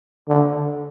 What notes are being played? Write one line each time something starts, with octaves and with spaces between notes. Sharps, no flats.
D3